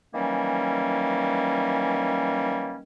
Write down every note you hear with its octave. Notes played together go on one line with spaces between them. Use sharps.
D#3 E3 F#3 G3 A#3 C#4